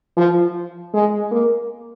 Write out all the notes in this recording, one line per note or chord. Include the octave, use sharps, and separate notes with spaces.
F3
G#3
A#3